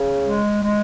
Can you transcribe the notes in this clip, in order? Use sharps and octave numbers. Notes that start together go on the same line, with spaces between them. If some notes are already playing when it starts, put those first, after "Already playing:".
Already playing: C#3
G#3
G#3